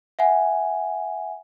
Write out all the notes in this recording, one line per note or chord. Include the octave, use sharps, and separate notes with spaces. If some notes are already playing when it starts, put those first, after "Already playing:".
E5 F#5 G#5